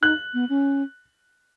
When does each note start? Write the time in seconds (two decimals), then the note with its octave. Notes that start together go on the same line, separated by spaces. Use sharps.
0.02 D#4 F#6
0.34 B3
0.49 C#4